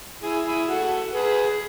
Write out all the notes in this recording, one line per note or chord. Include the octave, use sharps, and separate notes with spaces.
E4 G#4
E4 G#4
F#4 A4
G#4 B4